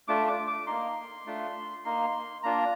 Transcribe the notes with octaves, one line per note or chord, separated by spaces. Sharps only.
A3 D4 F4 D6
D6
D6
A#3 D#4 C6
A3 D4 F4
A#3 D#4 C6
A#3 D4 F4 A#5